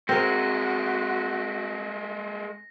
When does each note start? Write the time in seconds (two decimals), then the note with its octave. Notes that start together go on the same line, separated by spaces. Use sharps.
0.09 G#3 A3 C4 F#4 A#4 A#6